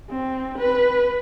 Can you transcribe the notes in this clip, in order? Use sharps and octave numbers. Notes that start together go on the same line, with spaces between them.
C4
B4